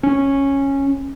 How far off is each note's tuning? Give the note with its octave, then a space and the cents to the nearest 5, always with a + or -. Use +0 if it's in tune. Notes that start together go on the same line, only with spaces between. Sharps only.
C#4 -10